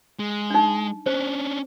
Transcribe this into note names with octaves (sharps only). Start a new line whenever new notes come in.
G#3
D4 D#4
C#4 D4 C5